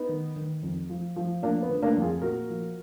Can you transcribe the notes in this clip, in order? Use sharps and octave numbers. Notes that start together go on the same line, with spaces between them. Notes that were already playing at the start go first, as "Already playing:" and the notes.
Already playing: B3 D#4
D#3
D#3
F2
F3
F3
F3 A#3 D4
B3
D3
A#3 D4
F2
F4 G#4
A#2 F#4 A#4
F3